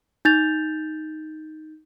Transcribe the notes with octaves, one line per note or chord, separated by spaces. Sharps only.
D#4 G6 A6 F7